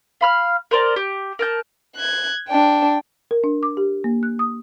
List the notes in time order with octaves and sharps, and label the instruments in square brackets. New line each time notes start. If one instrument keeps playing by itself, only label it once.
[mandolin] F5 B5 F6
A#4 C5 D5 A#5
G4
A#4 A5 G6
[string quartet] F#6 G#6
D4 G5
[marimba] A#4
D4
D6
G4
A#3
F#6
D#6